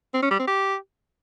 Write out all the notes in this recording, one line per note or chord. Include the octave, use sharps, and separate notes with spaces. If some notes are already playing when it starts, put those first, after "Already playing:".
C4
C#4
G3
C4
G4